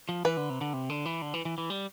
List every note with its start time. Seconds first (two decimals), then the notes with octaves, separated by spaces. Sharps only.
0.09 F3
0.25 E3 B4
0.37 D3
0.50 C3
0.61 D3
0.73 C3
0.89 D3
1.05 E3
1.22 D3
1.34 E3
1.45 E3
1.58 E3
1.70 G3